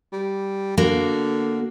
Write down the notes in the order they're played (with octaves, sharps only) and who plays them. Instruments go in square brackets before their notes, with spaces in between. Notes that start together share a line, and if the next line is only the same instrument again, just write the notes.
[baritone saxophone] G3
[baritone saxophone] D3 [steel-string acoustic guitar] A#3 F#4